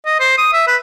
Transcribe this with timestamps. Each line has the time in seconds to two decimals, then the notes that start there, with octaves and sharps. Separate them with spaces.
0.06 D#5
0.20 C5
0.38 D#6
0.53 E5
0.67 B4